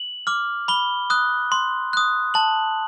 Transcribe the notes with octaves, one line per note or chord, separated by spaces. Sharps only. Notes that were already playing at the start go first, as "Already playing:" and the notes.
Already playing: F#7
D6 F6
B5 G7
D#6 F#6
C6
D#6 F#6
A5 F#7